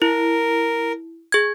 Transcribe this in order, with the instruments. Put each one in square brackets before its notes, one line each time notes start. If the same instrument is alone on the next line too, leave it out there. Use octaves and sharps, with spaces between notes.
[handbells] E4 [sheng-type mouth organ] A#4
[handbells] G#4 G#6